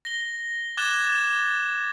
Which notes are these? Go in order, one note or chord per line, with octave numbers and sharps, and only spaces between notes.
A#6 G7
D6 F#6 G#6 A6 E7 G7